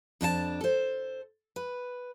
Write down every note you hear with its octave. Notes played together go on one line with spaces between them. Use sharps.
F2 D4 E4 A5
A4 C5
B4